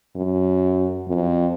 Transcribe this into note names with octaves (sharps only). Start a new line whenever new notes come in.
F#2
F2